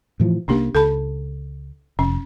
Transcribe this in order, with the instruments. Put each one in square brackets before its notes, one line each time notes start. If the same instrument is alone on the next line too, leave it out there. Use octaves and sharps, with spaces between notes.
[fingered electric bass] A2 E3 F3
[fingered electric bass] C2 A#3 [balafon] C#4 D4 G4
[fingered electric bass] C#2 [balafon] A4 A5 B5
[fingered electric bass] F1 [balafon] C#4